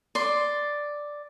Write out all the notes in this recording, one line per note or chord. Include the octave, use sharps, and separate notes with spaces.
D5 C6